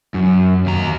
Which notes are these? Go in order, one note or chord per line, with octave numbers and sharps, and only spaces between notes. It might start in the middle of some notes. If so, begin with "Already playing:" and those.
F#2
D#2 A#5